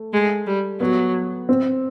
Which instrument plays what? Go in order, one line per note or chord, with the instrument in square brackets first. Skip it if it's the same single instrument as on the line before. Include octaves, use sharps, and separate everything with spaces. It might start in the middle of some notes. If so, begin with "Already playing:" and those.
Already playing: [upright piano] A3
[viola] G#3
G3
[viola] F#3 [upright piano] B3
[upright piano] C4